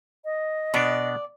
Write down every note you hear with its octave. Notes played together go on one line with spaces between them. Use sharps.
D#5
B2 B3 D4 D5